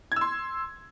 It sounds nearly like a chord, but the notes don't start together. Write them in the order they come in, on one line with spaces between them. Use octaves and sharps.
G#6 E6 C6